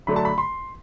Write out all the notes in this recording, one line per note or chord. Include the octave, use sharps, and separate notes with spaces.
D3 F#3 A3 D4 B5
A5
B5
C6